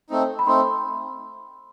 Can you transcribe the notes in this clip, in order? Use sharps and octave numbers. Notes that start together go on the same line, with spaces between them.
A3 C4 D#4
B5
A3 C4 D#4 C6